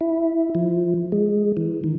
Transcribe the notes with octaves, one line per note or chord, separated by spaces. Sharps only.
E4
F3
G#3
E3
D#3